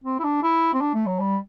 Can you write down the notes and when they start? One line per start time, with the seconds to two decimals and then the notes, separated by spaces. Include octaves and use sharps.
0.04 C4
0.19 E4
0.23 D4
0.43 E4
0.73 C4
0.81 D4
0.94 A3
1.07 F#3
1.20 G3